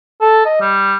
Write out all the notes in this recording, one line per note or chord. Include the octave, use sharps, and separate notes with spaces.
A4
D#5
G3